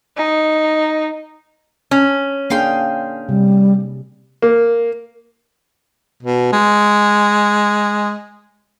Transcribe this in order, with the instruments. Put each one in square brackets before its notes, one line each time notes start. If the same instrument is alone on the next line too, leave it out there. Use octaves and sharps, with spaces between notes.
[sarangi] D#4
[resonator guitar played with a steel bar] C#4
[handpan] A#3 D4 G#4 [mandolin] F5 G5 C6
[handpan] C3 [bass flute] G3
[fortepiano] A#3
[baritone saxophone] B2
G#3